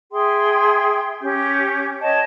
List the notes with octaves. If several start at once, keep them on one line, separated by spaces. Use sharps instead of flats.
G#4 E5 G5 C6
C#4 G4 G6
C#5 D#5 G5 A5